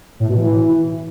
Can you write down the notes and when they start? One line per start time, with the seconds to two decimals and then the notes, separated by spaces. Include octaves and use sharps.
0.20 A2
0.29 B2
0.37 E3